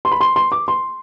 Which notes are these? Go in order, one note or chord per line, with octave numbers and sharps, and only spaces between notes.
C6
B5
C6
C6
D6
C6